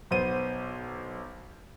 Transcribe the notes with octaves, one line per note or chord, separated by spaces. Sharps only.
B1 B3 C5 D#7